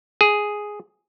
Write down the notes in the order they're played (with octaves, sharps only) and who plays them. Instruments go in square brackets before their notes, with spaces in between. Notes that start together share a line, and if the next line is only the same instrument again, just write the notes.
[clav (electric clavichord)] G#4